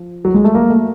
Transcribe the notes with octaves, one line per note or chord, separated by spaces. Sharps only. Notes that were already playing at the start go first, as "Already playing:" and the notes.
Already playing: F3
F#3
G#3
A3
A#3
A3